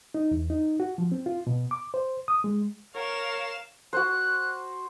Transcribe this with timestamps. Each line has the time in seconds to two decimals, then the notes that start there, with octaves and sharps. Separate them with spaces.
0.14 D#4
0.31 E2
0.50 D#4
0.80 F#4
0.98 F3
1.12 C4
1.26 F4
1.47 B2
1.71 D6
1.94 C5
2.28 D#6
2.44 G#3
2.95 A#4 C#5 F5 E7
3.93 F#4 C5 F#6